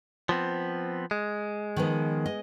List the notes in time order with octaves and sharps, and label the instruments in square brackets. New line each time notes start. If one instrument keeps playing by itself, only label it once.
[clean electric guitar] F3 B3 C4
G#3
[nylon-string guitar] D#3 F3 B3
D#5